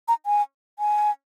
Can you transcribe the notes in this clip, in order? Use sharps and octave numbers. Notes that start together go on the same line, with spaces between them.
A#5
G#5
G#5